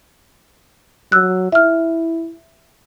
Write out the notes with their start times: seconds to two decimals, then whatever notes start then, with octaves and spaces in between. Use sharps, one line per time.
1.12 F#3 E6 F#6
1.52 E4 E5 F6